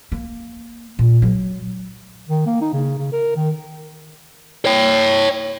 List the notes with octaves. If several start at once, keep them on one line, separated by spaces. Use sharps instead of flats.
A#3
A#2
F#3
D#3
A#3
D#4
C#3
C#3
A#4
D#3
C#5 G5